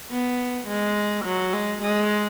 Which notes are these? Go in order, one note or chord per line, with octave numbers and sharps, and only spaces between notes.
B3
G#3
F#3
G#3
G#3